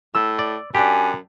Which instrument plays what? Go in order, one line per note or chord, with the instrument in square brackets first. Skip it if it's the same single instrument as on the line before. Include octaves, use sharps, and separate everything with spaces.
[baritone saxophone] A2 [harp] E6
[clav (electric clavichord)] D5
[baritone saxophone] F#2 [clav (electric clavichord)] D4 G4 [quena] G#5